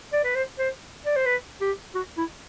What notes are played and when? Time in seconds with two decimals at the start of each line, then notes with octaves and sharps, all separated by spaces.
0.13 D5
0.24 B4
0.35 C5
0.58 C5
1.05 D5
1.16 C5
1.26 B4
1.61 G4
1.95 F#4
2.17 E4